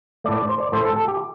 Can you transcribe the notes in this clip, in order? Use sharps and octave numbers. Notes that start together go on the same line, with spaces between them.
A2 A3 D5
D5
C5
D5
A2 A3 C5
A4
A4
G4